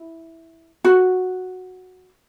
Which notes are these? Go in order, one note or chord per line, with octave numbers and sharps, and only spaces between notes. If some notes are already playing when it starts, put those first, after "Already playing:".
Already playing: E4
F#4